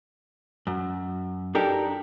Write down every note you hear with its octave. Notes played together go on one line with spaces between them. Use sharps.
F#2
D4 D#4 G4 A4 A#4